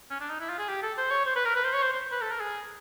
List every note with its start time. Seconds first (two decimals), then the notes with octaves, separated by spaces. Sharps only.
0.11 C#4
0.21 D4
0.30 D#4
0.40 E4
0.49 F4
0.58 G#4
0.68 G4
0.83 A4
0.98 C5
1.11 C#5
1.26 C5
1.36 B4
1.45 A#4
1.55 B4
1.64 C5
1.74 C#5
1.82 C5
1.93 C5
2.11 B4
2.21 A4
2.31 A#4
2.40 G#4